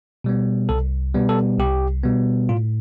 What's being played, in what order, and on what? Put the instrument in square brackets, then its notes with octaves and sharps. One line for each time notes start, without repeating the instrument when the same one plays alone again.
[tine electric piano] B2 G3 B3
C2 A4
B2 G3 B3
A4
C2 G4
B2 G3 B3
A2 F4